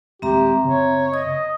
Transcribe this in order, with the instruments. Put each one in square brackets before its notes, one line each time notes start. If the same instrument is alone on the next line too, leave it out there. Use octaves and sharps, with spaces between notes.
[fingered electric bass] A#1 D#2 G#3 [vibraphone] C4 E5 A#5 [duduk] G4
[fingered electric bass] F#1 C#3 B3 [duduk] C#5
[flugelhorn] D#5 [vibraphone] D#6